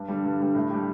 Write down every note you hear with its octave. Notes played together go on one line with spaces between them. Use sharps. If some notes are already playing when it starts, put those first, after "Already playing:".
Already playing: G2
D3 G3
G2
D3 G3
A2
G3 D4 G4